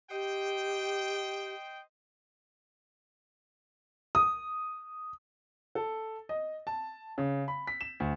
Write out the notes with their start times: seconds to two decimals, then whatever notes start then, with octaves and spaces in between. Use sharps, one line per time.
0.11 G4 C5 D#5 G5
4.15 D#6
5.75 A4
6.29 D#5
6.67 A5
7.18 C#3
7.48 B5
7.67 B6
7.81 E7
8.00 D2